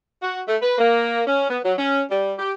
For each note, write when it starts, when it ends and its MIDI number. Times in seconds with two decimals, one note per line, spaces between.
0.22 0.41 66
0.47 0.56 57
0.61 0.78 71
0.78 1.23 58
1.27 1.45 61
1.49 1.59 59
1.64 1.73 54
1.78 2.02 61
2.11 2.34 55
2.39 2.53 67